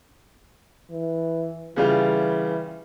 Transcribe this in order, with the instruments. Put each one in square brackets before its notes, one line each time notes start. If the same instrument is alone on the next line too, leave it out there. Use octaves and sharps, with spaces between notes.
[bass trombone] E3
[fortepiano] C#3 G3 F4 [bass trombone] E3